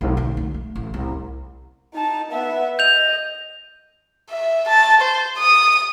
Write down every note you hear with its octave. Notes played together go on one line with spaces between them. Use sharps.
B1
D2
D2
A3
A1
C2
D#4 A5
B3 E5
D#5 G6 F7
E5
A5
C5
D#6